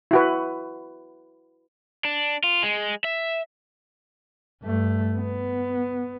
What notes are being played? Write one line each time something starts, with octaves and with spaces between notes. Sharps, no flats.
E4 F#4 B4
D4
F4
G#3
E5
G2 A3
B3